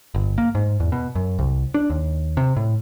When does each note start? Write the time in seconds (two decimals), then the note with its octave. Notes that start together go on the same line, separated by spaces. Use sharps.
0.14 G1
0.38 A#3
0.55 G#2
0.80 E2
0.92 B2
1.15 F#2
1.39 C2
1.74 D4
1.90 D#2
2.37 C3
2.57 A2